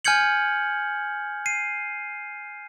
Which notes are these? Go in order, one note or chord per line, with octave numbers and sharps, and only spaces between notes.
G#5 F6 G6 G#6 C#7 F#7
C7 D#7